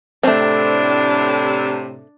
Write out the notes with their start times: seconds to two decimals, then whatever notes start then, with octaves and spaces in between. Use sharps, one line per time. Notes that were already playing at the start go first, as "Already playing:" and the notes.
0.23 A2 C3 A3 C4 D4